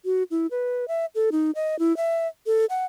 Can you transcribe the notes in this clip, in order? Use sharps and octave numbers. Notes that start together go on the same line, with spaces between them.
F#4
E4
B4
E5
A4
D#4
D#5
E4
E5
A4
F#5